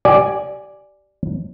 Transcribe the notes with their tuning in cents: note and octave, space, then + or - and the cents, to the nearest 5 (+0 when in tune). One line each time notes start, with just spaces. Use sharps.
G4 -30 D5 +0 G#5 +0